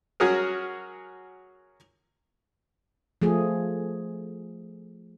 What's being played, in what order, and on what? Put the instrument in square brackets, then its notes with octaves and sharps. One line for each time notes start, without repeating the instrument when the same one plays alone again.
[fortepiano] F#3 C#4 F#4 G#4 A#4
[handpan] F3 A3 G#4